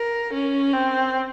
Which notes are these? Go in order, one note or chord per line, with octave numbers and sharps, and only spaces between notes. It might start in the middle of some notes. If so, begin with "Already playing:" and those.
Already playing: A#4
C#4
C4